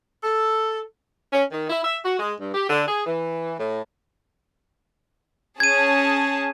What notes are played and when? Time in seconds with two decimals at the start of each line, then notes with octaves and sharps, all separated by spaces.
0.23 A4
1.33 C#4
1.51 D#3
1.70 E4
1.83 E5
2.05 F#4
2.19 G#3
2.40 G2
2.54 G4
2.70 D3
2.88 G#4
3.06 E3
3.60 A2
5.60 C#4 G#4 A5 G#6 D#7